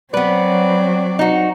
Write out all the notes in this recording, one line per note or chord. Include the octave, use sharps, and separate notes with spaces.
F#3 B3 C4 B4 D5
D#4 F#4